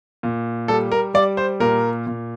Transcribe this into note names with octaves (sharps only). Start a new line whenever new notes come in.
A#2
G3 A4
A#4
G3 D5
C5
A#2 A#4
A#2